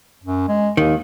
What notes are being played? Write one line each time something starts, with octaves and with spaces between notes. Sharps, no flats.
F#2
G#3
D#2 D#3